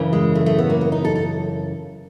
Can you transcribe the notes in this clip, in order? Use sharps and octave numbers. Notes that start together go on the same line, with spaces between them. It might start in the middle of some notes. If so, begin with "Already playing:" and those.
Already playing: F#2 C#3 E3
G#3
A3
A3
B3
A#3
B3
D#4
A4
A4